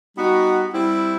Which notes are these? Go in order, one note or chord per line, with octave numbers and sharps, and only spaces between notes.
G3 B3 D#4 F#4
G3 C4 E4